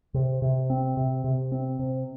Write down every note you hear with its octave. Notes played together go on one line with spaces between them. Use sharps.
C3
C3
C4
C3
C3
C4
C3